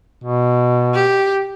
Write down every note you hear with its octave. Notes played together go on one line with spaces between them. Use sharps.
B2
G4